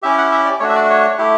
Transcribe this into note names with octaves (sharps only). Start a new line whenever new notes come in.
C#4 E4 G4 E5
F#5
E5
D5
A3 D4 F#4 C#5
E5
D5
C#5
A3 E4 G4